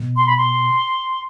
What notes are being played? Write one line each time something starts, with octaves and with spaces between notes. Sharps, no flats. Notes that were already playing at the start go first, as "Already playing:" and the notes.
Already playing: B2
C6
B5
C6